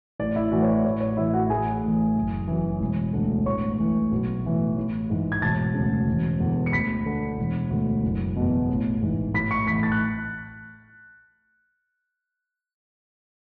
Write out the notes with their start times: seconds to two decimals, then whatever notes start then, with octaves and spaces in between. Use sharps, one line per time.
0.19 A1 D5
0.36 E4 E5
0.52 A2 E3 F#4 F#5
0.63 C#5
0.68 D5
0.84 A1 C#5
1.01 C#5
1.17 A2 E3 E4 E5
1.33 F#4 F#5
1.50 A1 G#4 G#5
1.82 A2
1.88 E3
2.16 F#1
2.48 F#2 E3
2.80 E1
3.13 D2 D3
3.46 A1 C#5 C#6
3.78 A2 E3
4.12 B1
4.45 A2 E3
4.76 A1
5.10 G#2 E3
5.32 G#6
5.42 E1 A5 A6
5.74 D2 C#3
6.08 E1
6.40 E2 D3
6.66 C#7
6.72 D2 B5 B6
7.06 D3
7.38 E1
7.70 D2 D3
8.03 F#1
8.36 E2 B2
8.69 A1
9.01 G#2 E3
9.34 A1 B5 B6
9.51 C#6 C#7
9.67 A2 E3 B5 B6
9.83 A5 A6
9.92 F#6